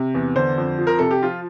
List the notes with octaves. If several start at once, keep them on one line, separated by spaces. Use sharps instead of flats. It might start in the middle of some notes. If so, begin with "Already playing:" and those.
Already playing: C3
E2
D3 C5
F2
F3
A#4
C3 A4
G4
F3 F4